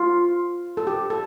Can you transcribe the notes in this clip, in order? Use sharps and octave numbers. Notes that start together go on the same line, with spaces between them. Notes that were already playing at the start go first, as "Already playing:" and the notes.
Already playing: F4
A4
G4
A4